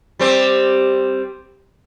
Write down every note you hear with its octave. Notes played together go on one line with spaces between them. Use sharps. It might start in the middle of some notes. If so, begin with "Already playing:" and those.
G3 C4 C5